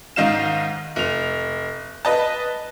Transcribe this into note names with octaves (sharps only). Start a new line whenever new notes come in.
G#2 D#3 D#4 F5 E7
F1 F7
B4 D#5 A5